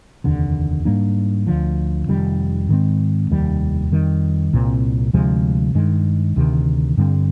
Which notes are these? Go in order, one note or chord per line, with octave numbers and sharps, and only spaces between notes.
F1 D#2 D3
G#2 G3 A#3 D4
D2 D3 F3
F1 F2 D#3 G3
G#2 D#3 G#3 C4
F1 D#2 D#3 G3
F2 D#3 G3
C2 A#2 F3 C4
D2 C3 F3 G#3
G2 D#3 G#3
D2 C3 D#3
G2 D3 G3 C4